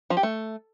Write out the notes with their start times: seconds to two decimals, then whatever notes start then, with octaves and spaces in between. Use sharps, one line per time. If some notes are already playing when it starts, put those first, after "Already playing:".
0.10 F3
0.17 G4
0.23 A3